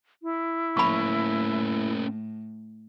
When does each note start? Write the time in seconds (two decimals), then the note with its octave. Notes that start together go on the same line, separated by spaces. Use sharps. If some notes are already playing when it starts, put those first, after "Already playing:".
0.22 E4
0.77 A2 A#3 C#4 B5 C#6